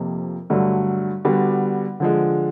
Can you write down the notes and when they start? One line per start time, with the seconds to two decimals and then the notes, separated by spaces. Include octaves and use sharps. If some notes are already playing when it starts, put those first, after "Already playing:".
Already playing: F2 C3 F3 A#3
0.50 G2 D3 F#3 A3
1.25 D3 G3 B3 D4 F#4
2.00 D3 F3 G#3